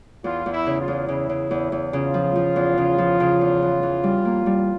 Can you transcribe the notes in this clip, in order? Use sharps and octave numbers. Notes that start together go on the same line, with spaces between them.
E2 F4
E2
E4
C#3
F4
E2
C#3 E4
C#3
E2
E2
C#3 F4
F3
F3
E2
C#3
F3
C#3
E2
E3
E3
G3
A#3
G3